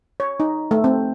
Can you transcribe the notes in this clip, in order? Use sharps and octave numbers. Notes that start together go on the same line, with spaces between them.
C#5
D#4
A3
C4